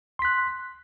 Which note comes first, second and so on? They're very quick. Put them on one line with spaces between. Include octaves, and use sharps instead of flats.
C6 B6 F#6